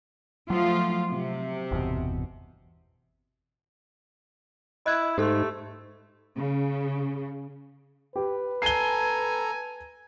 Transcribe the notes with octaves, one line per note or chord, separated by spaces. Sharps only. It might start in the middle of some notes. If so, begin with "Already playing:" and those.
F3 F#3 A3 F4
C3
G1 E2 B2
E4 D#5 F#6 G#6
G#2 A3 G4 A4 C6
C#3
G4 B4
A4 G#5 A#5 C7 G7